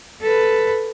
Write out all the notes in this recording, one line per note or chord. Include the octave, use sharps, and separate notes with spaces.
A4 B4